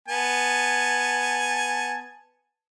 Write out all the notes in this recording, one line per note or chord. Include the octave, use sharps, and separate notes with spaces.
B3 G#5 A5